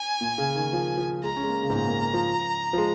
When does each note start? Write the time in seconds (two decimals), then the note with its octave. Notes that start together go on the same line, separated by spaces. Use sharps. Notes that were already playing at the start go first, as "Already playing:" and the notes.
Already playing: G#5
0.21 A#2
0.38 C#3
0.56 D#3
0.73 F3
0.97 F3
1.23 G#3 A#5
1.36 C#4
1.43 G#3
1.49 A#3
1.62 C#3
1.70 G#2
1.75 A#2 A#5
1.88 A#3
2.01 A#3
2.14 F3
2.73 F3
2.78 G#3